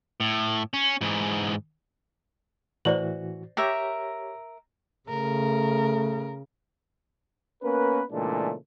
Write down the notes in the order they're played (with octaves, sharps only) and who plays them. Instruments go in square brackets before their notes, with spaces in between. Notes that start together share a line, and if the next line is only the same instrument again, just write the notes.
[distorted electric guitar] A2
C#4
G#2 E3
[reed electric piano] A2 E3 F#4 [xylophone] C5 D5 F#7
[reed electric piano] G4 C#5 [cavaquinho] A#4 E5
[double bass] C#3 [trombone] A3 [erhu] A#4
[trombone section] A#3 B3 C#4 A#4 B4
A#2 C#3 E3 G#3 A3 D4